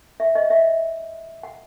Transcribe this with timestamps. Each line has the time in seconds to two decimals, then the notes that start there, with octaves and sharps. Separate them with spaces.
0.20 E5
0.35 D#5
0.50 E5
1.43 F#5